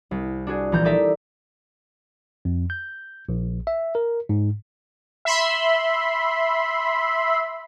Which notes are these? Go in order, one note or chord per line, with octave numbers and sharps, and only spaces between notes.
C2
D4 F#4 G#4
A#1 E3 A#5 G6
D#4 G4 A4 D5 E5 A#5
F2
G6
A#1
E5
A#4
G#2
E5 B5 C6